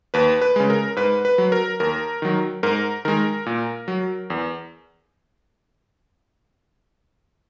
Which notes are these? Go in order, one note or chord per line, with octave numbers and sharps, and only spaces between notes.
D#2 B4
B4
C#3 G#3
A#4
G#2 B4
B4
F#3
A#4
D#2 A#4
D#3 F#3
G#2 A#4
D#3 G#3 A#4
A#2
F#3
E2